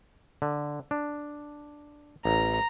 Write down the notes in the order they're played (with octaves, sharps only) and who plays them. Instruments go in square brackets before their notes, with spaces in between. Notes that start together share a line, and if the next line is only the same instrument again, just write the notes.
[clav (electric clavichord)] D3
D4
[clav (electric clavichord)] A1 [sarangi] A#5